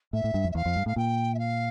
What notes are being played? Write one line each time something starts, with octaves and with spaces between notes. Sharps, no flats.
A2 E5
A2
G2
F2
E5
E2 F5
F2
G2
A2 F5
A#2 G5
E5
F5